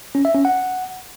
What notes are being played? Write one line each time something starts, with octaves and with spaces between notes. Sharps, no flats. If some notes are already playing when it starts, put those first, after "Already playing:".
C#4
E5
C#4
F#5